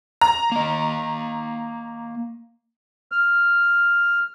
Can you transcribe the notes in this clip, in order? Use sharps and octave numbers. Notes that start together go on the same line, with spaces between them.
A#5
A#3 D#5
F6